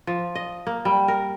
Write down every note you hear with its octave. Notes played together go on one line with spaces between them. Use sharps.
F3
D#5
A#3
G3
A#4